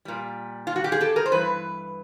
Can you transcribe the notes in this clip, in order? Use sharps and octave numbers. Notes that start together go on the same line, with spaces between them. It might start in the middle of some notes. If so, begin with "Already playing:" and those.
A#2 G3
F4
F#4
G4
G#4
G4 A4
G#4 A#4
C5
G2 E3 B4